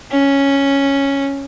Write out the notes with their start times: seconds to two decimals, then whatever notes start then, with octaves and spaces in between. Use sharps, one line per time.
0.11 C#4